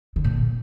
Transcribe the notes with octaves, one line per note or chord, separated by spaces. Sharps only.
D3
A2
A#2